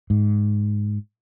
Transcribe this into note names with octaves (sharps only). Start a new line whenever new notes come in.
G#2